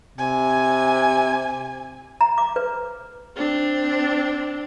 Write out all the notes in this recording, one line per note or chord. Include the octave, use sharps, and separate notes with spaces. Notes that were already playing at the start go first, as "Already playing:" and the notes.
C3 G#5
A#5
D6
B4
C4 D4